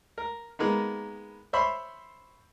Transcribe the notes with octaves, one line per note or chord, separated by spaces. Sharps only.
A#4
D#3 G#3 A#3 B3
C5 C#5 E5 B5 C6